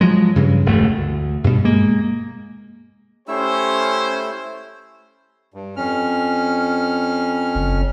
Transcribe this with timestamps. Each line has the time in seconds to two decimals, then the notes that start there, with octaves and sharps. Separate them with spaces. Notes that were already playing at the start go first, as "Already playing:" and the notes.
0.01 F3 F#3 G#3
0.36 G2 C#3
0.66 E1 D2 A3
0.98 D2
1.44 G2 B2
1.65 G#3 A#3
3.28 A3 C#4 E4 G4 C5 E6
5.54 G2
5.76 F2 C#4 F6
7.55 F#1